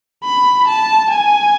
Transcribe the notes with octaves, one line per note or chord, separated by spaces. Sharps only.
B5
A5
G#5